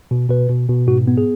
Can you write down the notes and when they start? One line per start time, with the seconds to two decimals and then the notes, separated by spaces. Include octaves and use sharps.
0.11 B2
0.29 B2 B4
0.50 B2
0.69 B2
0.87 G#2 F#4
1.08 B3
1.18 G#4